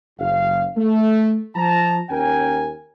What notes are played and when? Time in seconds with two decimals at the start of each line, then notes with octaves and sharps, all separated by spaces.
0.19 F#1 F5
0.77 A3
1.55 F3 A5 A#5
2.09 D#2 C#4 A#4 G5 G#5